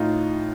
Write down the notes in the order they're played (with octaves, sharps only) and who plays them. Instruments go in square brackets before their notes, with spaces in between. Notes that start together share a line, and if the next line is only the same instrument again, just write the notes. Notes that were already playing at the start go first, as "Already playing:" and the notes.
Already playing: [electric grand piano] A2 D#4 F4